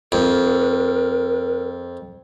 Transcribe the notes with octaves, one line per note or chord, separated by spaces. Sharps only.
F2 A#4